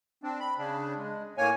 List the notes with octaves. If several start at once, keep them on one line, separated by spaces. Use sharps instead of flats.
C4 D4
B5
C#3 D4
G#3
A2 A#3 C#5 G#5